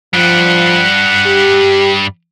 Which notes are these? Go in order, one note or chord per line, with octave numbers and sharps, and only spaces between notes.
G2 F3 G3 F#5
G4